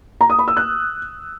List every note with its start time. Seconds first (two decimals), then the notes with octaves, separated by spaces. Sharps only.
0.21 A#5
0.30 D#6
0.39 B5
0.48 E6
0.57 F#6